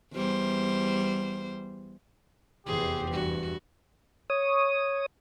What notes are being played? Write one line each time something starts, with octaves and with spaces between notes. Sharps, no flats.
E2 G3 C5
F1 E2 E3 G4 G#4 C5
G2 F#4
C#5 D#6